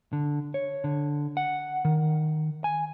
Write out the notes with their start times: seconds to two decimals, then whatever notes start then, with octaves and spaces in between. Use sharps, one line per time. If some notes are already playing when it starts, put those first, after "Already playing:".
0.13 D3
0.54 C#5
0.84 D3
1.37 F#5
1.85 D#3
2.64 G#5